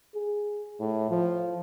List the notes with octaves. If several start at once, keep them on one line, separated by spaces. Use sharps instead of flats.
G#4
A2
F3